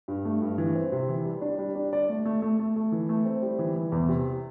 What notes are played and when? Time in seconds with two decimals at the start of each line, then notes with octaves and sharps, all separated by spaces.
0.08 G2
0.25 A3
0.42 G2
0.58 E3
0.75 C4
0.92 C3
1.09 E3
1.26 G3
1.42 D4
1.59 G3
1.75 D4
1.93 D5
2.09 A3
2.25 A3
2.42 A3
2.59 A3
2.76 A3
2.92 E3
3.09 A3
3.25 C4
3.43 G3
3.59 E3
3.76 E3
3.92 E2
4.09 C3